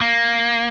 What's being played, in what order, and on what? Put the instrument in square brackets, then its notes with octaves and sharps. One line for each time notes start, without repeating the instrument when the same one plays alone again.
[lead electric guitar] A#3